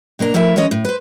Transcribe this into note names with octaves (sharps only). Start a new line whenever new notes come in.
B2 A#3 D4 A#5
F3 A3 E4 A#4 E5
E3 G#3 C#4 C#5 D#5
A2
B4 C5